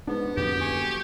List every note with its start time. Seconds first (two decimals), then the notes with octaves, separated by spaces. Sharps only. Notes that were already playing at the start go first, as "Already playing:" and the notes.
0.07 G#2 B3 D4
0.37 F#1 F2 D3 C#4 G4
0.61 G#5 C#6